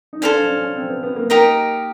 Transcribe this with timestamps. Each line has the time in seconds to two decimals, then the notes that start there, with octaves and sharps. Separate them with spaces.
0.13 D#4
0.21 D4 A4 C5 F5 G#5
0.35 D4
0.49 C#4
0.62 C#4
0.76 C4
0.89 B3
1.03 B3
1.16 A#3
1.30 D#4 G4 A#4 D#5